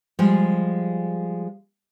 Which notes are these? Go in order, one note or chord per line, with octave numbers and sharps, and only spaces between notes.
F3 G3 G#3